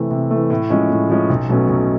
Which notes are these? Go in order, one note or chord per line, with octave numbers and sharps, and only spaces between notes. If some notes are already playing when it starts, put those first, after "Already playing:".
Already playing: C3 E3 A3
C3
E3 A3
A2
F3 G#3 C#4
A2
F3 G#3 C#4
B1
B2 F#3 A3 C#4
B1